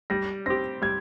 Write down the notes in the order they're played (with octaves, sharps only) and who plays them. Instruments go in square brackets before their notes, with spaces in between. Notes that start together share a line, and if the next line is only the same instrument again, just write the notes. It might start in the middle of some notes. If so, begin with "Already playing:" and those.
[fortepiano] G3 [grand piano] A#6
[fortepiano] C4 G4 [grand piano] A#6
[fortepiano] G3 [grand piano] G#6